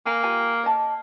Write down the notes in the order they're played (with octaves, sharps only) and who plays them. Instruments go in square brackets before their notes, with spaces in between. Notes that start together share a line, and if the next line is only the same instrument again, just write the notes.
[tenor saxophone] A#3 [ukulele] G#5 A#5
[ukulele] F4 G4 G#5
C#5 D#5 A5